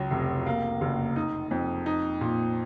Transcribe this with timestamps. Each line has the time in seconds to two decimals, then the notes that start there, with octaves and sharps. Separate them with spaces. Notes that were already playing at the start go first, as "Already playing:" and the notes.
Already playing: C#2 F#3
0.11 F1
0.46 A#3
0.81 F#1
1.16 D#4
1.51 F2
1.86 D#4
2.21 A#2